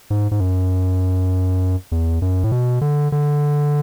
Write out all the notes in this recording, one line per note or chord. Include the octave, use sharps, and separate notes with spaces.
G#2
G#2
F#2
E2
F#2
A2
B2
D3
D3